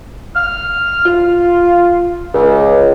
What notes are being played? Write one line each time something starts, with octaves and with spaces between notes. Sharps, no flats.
F6
F4
C#2